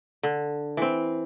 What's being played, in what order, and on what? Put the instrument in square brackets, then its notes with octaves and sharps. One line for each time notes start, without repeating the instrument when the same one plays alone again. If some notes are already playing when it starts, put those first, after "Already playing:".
[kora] D3
E3 C4